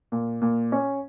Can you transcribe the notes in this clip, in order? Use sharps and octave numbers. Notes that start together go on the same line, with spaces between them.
A#2
A#2
C#4